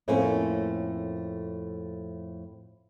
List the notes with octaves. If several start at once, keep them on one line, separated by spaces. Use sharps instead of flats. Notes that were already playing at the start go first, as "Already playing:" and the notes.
F2 A2 A3 A#3 C4 C#4